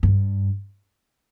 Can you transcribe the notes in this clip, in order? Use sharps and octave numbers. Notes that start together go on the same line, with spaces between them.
G2